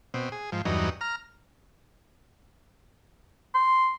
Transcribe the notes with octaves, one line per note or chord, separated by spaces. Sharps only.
B2 C4
G#4
G#2 F3
E2 G2 F#3 D#4
A#5 F6
C6